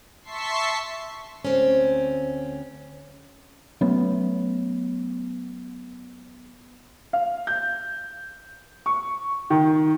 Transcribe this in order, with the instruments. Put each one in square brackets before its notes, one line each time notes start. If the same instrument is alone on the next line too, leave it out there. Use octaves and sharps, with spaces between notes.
[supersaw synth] E5 A5 C6 C#6 B6 C7
[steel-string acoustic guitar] D2 C4 C#4
[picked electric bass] F#3 A3 B3 C#4
[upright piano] F5
G6
C#6
D#3